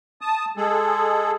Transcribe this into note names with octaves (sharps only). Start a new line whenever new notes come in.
A5 D#6
G#3 G#4 A4